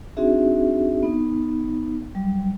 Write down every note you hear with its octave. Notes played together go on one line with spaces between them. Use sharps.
C4 D4 D#4 F#4 G#4 E5
B3 D#4
F#3 G3